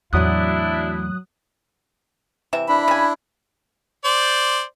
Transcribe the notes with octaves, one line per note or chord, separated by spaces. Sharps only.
E2 A2 F#3 D4 E4 D#6 F#6
C3 E3 E5
D4 E4 B5
C#3 G#5
C5 D5